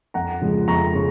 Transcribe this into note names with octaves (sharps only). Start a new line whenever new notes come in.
F2 F#5 A#5
C#3 F3 G#3
F2 A#5 C#6
C#3